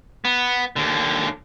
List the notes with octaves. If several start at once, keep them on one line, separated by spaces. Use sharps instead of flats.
B3
D#2 D3